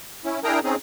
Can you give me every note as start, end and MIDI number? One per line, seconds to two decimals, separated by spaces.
0.25 0.40 61
0.25 0.40 64
0.44 0.59 62
0.44 0.59 64
0.44 0.59 68
0.44 0.59 70
0.44 0.59 79
0.44 0.59 82
0.64 0.75 60
0.64 0.75 61
0.64 0.75 63
0.64 0.75 68